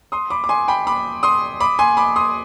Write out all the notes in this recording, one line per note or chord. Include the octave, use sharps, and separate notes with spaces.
C6 D#6
B5 D6
D6
G#5 C6
G5 B5
B5 D6
C6 D#6
B5 D6
G#5 C6
B5 D6
C6 D#6